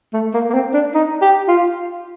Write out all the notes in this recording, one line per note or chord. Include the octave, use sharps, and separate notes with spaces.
A3
A#3
A#3
C4
D4
D#4
G4
F4